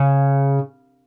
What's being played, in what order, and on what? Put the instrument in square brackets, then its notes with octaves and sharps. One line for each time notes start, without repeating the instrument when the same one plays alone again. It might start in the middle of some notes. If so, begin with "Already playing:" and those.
Already playing: [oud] C#3